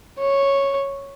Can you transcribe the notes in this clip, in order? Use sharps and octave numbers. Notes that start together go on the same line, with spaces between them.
C#5